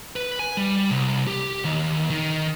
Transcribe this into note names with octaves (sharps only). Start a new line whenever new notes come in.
B4
G#5
G3
C2
G4
D#2
D#3